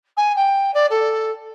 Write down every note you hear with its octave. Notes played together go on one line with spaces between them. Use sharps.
G#5
G5
D5
A4